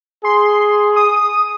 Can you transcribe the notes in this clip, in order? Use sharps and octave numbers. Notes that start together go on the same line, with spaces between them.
G#4 C6
D#6